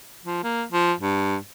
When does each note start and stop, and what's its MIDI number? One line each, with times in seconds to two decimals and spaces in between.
0.24 0.43 53
0.43 0.64 58
0.71 0.92 53
1.00 1.36 43